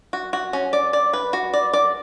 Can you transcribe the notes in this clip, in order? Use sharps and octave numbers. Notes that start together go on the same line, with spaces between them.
F#4
F#4
C#4
D5
D5
B4
F#4
D5
D5